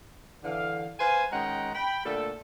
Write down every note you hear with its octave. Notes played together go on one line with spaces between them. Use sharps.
D3 E3 F5
B4 C5 F5 G#5
D#3 G#3 C#4 F#5 G5 A#5
G5 B5
A#2 D3 A3 A4